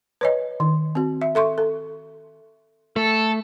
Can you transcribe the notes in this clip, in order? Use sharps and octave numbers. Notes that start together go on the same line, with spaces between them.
B4 C#5 D#5
D#3
C4 F#4
E5
A4 E5 C6 C#6
A4
A3 A4